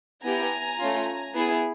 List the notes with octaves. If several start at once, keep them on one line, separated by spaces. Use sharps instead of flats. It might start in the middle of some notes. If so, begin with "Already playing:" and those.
B3 E4 G4 G#5 A#5
A3 C#4 F4
B3 E4 G#4